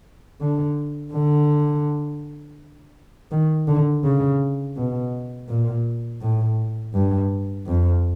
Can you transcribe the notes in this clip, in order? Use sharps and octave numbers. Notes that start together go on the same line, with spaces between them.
D3
D3
D#3
D3
C#3
B2
A#2
A2
G2
F2